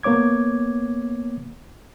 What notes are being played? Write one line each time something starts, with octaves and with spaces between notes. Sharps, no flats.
A#3 B3 C#5 D6 G#6